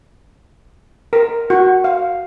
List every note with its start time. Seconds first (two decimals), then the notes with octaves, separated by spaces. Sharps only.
1.13 A#4
1.50 F#4
1.84 F5